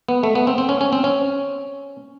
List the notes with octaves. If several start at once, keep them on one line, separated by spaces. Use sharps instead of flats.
B3
A3
B3
C4
C4
C#4
C#4
C4
C#4